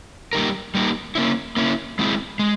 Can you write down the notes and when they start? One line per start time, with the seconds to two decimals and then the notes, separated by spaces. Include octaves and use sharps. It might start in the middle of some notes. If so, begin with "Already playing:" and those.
0.33 G3 A#3 D#4 G4 A#4
0.75 G3 A#3 D#4 G4 A#4
1.15 A#3 C#4 E4
1.57 A#3 C#4 E4
1.99 G#3 C4 E4 G#4
2.39 G#3